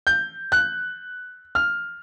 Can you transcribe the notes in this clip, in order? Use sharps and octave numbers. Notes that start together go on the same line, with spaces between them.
G6
F#6
F6